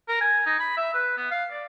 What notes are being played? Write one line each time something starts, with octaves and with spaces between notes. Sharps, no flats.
A#4
G#5
D#4
B5
E5
B4
B3
F5
D5